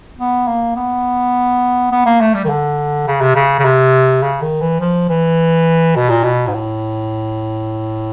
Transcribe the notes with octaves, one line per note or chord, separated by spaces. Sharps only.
B3
A#3
B3
B3
A#3
A3
G3
D#3
D3
C#3
C3
C#3
C#3
C3
C#3
D#3
E3
F3
E3
B2
A#2
B2
G#2
A2